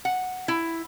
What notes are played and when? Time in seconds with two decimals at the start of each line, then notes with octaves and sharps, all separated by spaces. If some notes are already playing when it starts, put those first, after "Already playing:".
0.05 F#5
0.48 E4